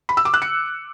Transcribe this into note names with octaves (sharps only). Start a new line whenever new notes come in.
B5
E6
D6
F#6
C#7